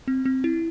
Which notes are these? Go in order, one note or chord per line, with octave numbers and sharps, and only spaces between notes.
C4
C4
E4